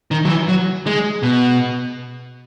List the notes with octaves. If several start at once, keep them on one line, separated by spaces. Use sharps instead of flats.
D#3
F#3
E3
F#3
G#3
B2